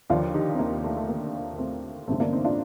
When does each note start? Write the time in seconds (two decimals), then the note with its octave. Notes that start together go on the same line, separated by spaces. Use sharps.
0.10 D#2 D3 F3 D4 F4
0.34 D#4 G4
0.54 C4
0.59 A#3
0.84 A3
0.97 A3
1.09 A#3
1.58 A3 C4
2.08 A1 G2 D3 A3 C4
2.20 A#3 D4
2.32 C4 D#4
2.44 D4 F4